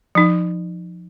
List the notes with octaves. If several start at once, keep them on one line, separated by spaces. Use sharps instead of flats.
F3 D#4